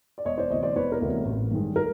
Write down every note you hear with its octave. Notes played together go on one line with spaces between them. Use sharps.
D5
E1 C#5 D#5
C5 D5
D2 C3 E3 C#5 D#5
C5 D5
E1 B4 C#5
A#4
D2 C3 E3
A1
G2 D#3 G#3
A#4